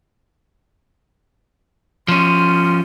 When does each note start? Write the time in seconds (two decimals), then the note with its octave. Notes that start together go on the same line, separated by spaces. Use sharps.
2.08 F3 C#4 C6